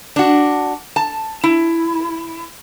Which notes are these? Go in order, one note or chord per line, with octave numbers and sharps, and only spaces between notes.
D4 F#4
A5
E4